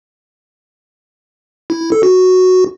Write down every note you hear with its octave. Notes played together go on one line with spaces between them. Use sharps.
E4
E4
A4
F#4